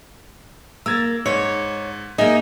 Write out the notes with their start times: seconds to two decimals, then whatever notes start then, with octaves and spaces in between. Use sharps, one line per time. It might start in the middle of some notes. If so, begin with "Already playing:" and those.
0.86 A#3 E6 G#6 A6
1.26 G#2 C#5
2.18 A#3 D#4 G#4 D#5 E5